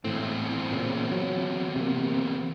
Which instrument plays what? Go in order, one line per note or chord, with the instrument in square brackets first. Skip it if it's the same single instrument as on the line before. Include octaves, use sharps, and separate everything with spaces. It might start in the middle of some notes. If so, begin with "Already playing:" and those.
[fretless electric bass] G#1 A2 [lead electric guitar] E2 C4
[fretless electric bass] A#2 C#3
F#3
C3 A#3